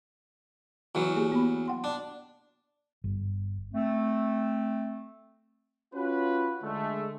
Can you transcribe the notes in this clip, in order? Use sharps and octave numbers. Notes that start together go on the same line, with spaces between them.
E2 E3 F#3
A#3 G4 G#4
B3 B5
F#5 G5 C6
D4
G1
A3 C4
C#4 F4 F#4 B4
D3 G#3 A3